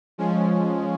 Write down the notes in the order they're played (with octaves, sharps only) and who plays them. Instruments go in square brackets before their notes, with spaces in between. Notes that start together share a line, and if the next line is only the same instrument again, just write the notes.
[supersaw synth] F3 G#3 C#4